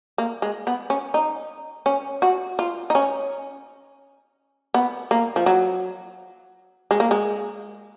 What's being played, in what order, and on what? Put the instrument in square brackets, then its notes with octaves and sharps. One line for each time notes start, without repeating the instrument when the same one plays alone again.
[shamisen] A#3
G#3
B3
C#4
D#4
C#4
F#4
F4
D#4
C#4
B3
A#3
F3
F#3
G#3
A#3
G#3